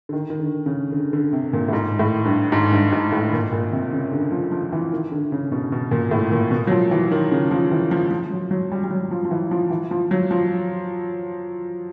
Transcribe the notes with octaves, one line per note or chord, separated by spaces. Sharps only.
D3
D#3
D#3
D3
C#3
D3
D3
C3
A#2
A2
G#2
A2
G2
G#2
G2
G#2
A2
A#2
A#2
C3
C#3
D3
F3
F3
E3
D#3
D3
C#3
B2
B2
A#2
A2
A#2
B2
F#3
F3
E3
D#3
C#3
F3
E3
F3
F3
F#3
F#3
G3
G3
F#3
F3
F3
E3
F3
E3
F3
F#3
F3